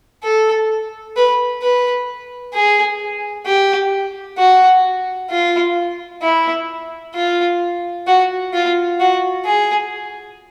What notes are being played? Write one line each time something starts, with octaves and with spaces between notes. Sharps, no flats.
A4
B4
B4
G#4
G4
F#4
F4
E4
F4
F#4
F4
F#4
G#4